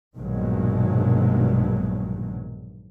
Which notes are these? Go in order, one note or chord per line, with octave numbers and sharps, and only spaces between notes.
A#1 G2 B2 D#3 F#3 G#3